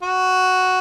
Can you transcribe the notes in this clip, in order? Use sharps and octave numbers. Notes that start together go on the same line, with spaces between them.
F#4